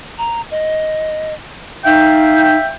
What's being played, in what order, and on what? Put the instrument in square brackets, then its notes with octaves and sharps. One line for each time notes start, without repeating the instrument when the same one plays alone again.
[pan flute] A#5
D#5
[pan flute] D#4 [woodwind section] E5 F5 G5